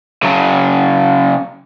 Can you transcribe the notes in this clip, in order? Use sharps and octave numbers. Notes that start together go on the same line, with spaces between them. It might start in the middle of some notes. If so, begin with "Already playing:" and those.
C#3 F#3